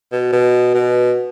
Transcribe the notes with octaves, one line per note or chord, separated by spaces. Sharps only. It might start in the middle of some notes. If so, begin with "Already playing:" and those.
B2
B2
B2